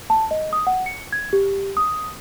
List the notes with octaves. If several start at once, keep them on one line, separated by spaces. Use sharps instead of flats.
A5
D#5
D#6
F#5
C#7
G#6
G4
D#6